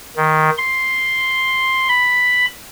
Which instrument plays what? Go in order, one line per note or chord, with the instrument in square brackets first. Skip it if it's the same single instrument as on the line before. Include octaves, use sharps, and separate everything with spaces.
[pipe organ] D#3
C6
B5